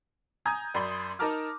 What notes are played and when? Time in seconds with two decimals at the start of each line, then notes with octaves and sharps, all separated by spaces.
0.45 G#5 A#5 D#6 G6 G#6
0.74 F#2 D5 B5 C6
1.19 D#4 A#4 A5 A#5 D6 F6